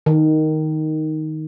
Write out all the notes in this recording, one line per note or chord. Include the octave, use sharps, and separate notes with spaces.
D#3